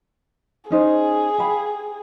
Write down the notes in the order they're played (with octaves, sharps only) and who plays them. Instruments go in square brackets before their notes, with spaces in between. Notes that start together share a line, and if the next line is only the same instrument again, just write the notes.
[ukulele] C#4 D#4 C5 [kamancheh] G#4
[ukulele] G4 F5 B5